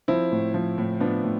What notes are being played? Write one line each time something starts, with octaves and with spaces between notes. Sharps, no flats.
F3 C4 E4
A2
F3
A2
F3 B3 D4
A2